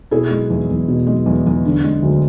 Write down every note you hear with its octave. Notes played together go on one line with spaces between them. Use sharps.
B2 E4 G#4
G#3
E2
E2
B2
G#3
E2
E2
D3
G#3
D2